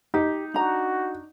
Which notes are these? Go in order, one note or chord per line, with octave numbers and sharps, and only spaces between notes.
D#4 G4
D4 F#4 A#5